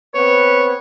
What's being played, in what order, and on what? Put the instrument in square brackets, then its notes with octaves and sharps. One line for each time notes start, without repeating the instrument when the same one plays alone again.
[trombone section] B3 C4 B4 [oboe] C#5